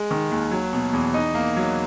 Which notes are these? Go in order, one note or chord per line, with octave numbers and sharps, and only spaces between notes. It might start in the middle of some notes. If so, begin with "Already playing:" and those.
Already playing: G#3
D#3
D#2
F#3
B2
E2
D#4
A#3
F#3